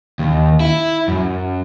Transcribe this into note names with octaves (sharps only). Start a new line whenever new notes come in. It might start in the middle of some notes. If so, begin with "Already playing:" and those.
D#2
E4
F#2